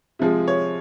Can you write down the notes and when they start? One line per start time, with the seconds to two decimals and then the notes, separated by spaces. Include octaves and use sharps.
0.19 C3 F3 G#3
0.48 C#5